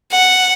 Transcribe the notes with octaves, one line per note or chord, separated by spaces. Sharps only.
F#5